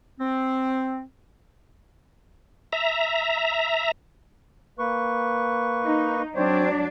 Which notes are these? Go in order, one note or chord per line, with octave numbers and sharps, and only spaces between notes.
C4
E5 A#5
A#3 B4 C#6
D#4
F#3 C4 D4 C5 C#5